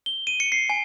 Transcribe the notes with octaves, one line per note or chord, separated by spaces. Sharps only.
G7
D#7
C#7
C7
G#5